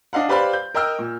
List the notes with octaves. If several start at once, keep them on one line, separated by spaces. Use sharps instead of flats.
D4 D#5 F5 F#5
G4 B4 C5 D5 F5 B5
G6
A#4 D#5 G5 E6 F6
A#2